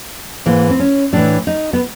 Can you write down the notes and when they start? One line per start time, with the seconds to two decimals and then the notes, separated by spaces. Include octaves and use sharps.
0.46 G#2 E3 A#3
0.70 C4
0.80 C#4
1.13 A2 E3 D4
1.47 D#4
1.73 B3